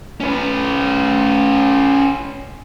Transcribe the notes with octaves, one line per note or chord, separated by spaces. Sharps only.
C#4 B4